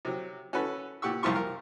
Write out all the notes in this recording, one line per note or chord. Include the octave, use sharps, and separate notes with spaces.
C3 F#3
C#4 F#4 A4 B4
A#2 G4 F#5 C#6 E6
C2 F#2 F3 F4 C6 C#6
A#4